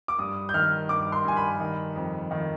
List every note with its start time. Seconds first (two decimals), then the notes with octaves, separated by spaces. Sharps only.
0.08 D6
0.19 G2 D#6
0.49 G6
0.54 D#3 F6
0.89 G2 D6
1.12 C6
1.25 G2 G#5
1.37 B5
1.60 D#3
1.96 F2
2.31 D#3